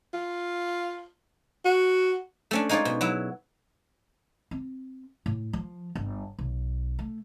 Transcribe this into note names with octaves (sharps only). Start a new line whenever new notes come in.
F4
F#4
A3 C#4 D4
G#3 D#4 F4 C#5 D5
B2
F#3 E4
C4
A2
F3
G1
B1
A3